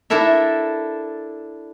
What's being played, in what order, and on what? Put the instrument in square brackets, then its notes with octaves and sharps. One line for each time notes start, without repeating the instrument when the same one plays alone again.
[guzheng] D4 E4 A4 A#4 E5